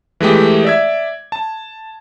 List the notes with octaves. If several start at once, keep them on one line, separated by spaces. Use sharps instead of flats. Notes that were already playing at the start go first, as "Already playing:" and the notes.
E3 G#3 A3 G4
D5 E5 G#6
A5